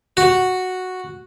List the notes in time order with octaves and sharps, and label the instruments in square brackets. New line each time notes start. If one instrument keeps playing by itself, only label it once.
[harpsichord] F#4